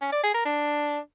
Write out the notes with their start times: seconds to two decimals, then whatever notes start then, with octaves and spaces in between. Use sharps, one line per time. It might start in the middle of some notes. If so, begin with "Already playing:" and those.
0.01 C#4
0.12 D5
0.23 G#4
0.34 A#4
0.45 D4